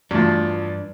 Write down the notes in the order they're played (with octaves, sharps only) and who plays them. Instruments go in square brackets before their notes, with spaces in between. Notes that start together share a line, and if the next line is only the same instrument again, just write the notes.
[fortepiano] E2 F3 [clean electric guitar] G2 D4 [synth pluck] A3 F#4